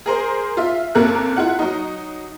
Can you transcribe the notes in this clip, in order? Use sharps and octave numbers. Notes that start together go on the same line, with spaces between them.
G#4 A#4 C5
F4 E5
F#1 C3 A#3 A4 A#4 F#6
E4 F4 F#5
F#3 D#4